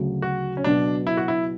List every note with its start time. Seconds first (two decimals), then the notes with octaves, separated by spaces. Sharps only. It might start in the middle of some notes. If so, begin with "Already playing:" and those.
Already playing: D2 C#3 F#3
0.22 F#4
0.57 C#4
0.64 B2 F#3 B3 D4
1.07 E4
1.17 F#4
1.28 E4